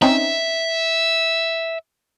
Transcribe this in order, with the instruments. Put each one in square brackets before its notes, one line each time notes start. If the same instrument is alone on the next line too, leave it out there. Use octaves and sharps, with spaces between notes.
[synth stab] C4 C#4 D#4 [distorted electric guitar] E5